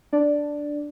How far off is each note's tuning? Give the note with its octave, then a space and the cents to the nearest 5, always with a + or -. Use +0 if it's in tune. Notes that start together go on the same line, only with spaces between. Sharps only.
D4 +0 D5 +0